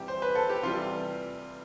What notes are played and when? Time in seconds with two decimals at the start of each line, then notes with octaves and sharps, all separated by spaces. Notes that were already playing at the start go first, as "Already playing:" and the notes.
Already playing: C3 E3 G3 G4
0.08 C5
0.22 B4
0.35 A4
0.49 G4
0.63 C3 E3 G3 F4